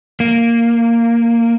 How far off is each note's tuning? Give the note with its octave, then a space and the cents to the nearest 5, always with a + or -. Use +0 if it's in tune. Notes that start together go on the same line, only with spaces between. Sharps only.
A#3 -5